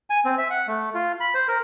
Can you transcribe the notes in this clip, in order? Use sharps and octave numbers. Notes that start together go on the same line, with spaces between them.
G#5
C4
E5
F#5
A3
F4
B5
C5
A#4